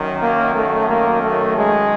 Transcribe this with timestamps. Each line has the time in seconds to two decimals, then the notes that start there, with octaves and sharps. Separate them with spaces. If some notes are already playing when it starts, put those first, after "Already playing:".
Already playing: F#2 D#3
0.18 A#3
0.53 A3
0.87 A#3
1.20 A3
1.55 G#3